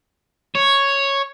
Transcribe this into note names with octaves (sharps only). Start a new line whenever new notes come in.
C#5